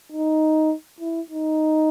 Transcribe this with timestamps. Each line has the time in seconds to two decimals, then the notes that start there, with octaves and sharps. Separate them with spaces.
0.12 D#4
1.00 E4
1.30 D#4